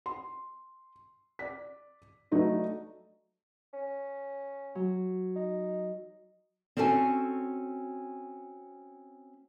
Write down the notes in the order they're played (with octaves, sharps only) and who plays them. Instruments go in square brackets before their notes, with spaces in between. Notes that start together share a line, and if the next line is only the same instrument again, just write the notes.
[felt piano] C6
D5 B6
F#3 A3 D4 D#4 B4
[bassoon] C#4
[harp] F#3
[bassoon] D#4
[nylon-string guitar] C4 C#4 F#4 A4 F#5 G#5